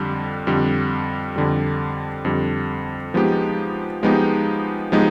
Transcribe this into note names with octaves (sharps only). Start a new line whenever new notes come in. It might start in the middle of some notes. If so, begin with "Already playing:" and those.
Already playing: F2 D3 G3
F2 D3 G3
F2 D3 G3
F2 D3 G3
F3 G#3 B3 D#4 G4
F3 G#3 B3 D#4 G4
F3 G#3 B3 D#4 G4